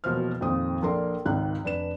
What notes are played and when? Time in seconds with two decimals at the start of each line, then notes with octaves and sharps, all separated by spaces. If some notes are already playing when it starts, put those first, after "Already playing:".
0.04 E1 B2 F3 A#3 C5 F6
0.41 F2 A#2 D#3 C4 D#6
0.82 A#1 A#3 D4 A4 A#4 C6
1.25 G#1 C#2 D#3 F#6
1.63 F1 D4 B4 E7